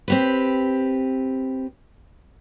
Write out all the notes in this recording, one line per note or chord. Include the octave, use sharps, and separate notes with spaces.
C4 G4 B4